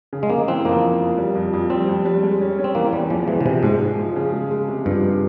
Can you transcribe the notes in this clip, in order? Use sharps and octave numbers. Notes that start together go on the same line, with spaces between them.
C#3
G#3
C#3 A#3
E3 C4
F2 A#3
F2
F2
G3
F2
F2
G3 C4
F2
G3
G#3
C#4
C#4
C4
E3 A#3
E2 G3
E2 F3
E3 G#3
C#3
C3 F3
G#2 G#3
G#3
F3
C#3
G#3
G#3
C3
G2 F3
C3